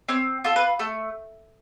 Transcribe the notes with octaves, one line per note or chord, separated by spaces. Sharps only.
C4 C#5
F4 A4
B4
A3 A4